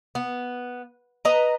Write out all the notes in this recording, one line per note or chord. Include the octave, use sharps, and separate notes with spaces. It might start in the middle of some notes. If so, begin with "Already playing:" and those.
B3
B4 D#5 A#5